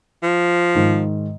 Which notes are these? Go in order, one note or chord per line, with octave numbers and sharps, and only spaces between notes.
F3
G#2 D#3